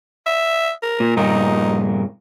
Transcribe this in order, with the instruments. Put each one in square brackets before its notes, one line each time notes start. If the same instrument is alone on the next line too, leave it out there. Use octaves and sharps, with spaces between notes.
[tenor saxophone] E5
A#4
[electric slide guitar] A#2
[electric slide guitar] G2 A#2 A#4 [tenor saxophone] D#4